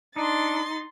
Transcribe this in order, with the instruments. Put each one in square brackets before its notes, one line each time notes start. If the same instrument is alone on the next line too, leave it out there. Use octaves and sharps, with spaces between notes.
[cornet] D4 [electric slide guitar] D#4 [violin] C6 A6